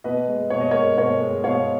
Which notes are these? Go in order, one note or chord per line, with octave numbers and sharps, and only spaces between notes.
B2 B4 D#5
G#3
B2 C#5
D#5
A#4 C#5
G#3
B2 A#4 C#5
G#3
B2 C#5 F5